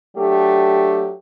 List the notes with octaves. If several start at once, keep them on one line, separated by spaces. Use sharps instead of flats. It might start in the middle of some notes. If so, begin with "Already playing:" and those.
F#3 A3 D4 G4